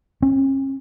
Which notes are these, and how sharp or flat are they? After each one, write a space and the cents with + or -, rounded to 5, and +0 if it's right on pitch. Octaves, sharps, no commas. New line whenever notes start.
C#4 -40